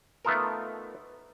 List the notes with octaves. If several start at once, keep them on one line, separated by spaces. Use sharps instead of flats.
A3 B3 D#4 F4 A4 A#4